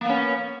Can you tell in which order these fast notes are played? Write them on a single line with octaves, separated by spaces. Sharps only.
A#3 B3 C#4